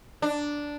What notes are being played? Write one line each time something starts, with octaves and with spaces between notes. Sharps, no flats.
D4